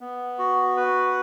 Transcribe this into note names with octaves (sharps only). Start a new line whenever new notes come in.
B3
F#4
B4